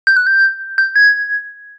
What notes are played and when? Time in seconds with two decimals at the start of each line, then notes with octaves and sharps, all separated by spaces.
0.07 G6
0.16 F#6
0.27 G6
0.78 G6
0.96 G#6